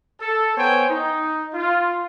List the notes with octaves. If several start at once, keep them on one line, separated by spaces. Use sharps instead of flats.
A4
B3 C5 C#5 G5 G#5
D#4
F4